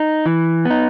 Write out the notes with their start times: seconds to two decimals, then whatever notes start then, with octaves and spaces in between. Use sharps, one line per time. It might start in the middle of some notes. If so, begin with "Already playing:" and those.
Already playing: D#4
0.26 E3
0.65 B3 D#4